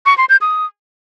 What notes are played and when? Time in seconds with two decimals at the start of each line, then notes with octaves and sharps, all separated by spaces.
0.06 C#6
0.18 C6
0.29 G6
0.41 D#6